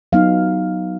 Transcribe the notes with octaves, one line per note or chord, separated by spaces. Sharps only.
F#3 B3 D#4 F5